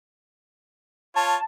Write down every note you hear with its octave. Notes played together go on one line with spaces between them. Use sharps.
F4 C#5 A5